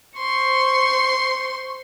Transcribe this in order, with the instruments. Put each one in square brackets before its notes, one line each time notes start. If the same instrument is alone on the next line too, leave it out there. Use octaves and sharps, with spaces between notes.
[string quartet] C5 C6 C#6